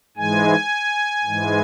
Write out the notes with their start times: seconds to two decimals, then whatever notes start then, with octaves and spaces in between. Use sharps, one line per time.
0.17 G#2 E3 G#3 G#5
1.24 G#2 E3 G#3